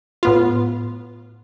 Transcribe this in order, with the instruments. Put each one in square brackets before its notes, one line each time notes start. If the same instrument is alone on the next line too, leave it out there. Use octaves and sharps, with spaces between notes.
[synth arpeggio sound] A2 B3 F4